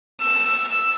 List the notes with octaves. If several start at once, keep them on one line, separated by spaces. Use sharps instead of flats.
E6
E6